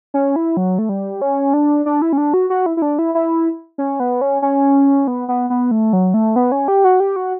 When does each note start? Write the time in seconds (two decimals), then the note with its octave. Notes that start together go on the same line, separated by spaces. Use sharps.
0.14 C#4
0.36 E4
0.57 F#3
0.79 A3
0.89 G3
1.22 C#4
1.53 D4
1.86 D4
2.02 E4
2.13 C#4
2.18 D4
2.34 F#4
2.50 F#4
2.66 E4
2.77 E4
2.82 D4
2.99 E4
3.15 E4
3.78 C#4
4.00 B3
4.21 C#4
4.42 C#4
5.07 B3
5.28 B3
5.50 B3
5.71 A3
5.93 F#3
6.14 A3
6.36 B3
6.52 C#4
6.68 G4
6.84 F#4
7.00 G4
7.16 F#4